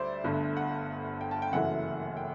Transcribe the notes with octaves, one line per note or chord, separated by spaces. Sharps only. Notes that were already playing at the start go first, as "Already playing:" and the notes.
Already playing: D2 D3 G3 C5 D5 E5
G1 G2 D3 A3
F#5
G5
A5
G5
F#1 F#2 E3 A3 F#5
G5